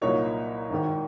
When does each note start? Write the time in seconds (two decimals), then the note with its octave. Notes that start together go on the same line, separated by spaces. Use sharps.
0.02 C2 A#2 F#3 A#3 D#4 C#5
0.70 G#1 G#2 D#3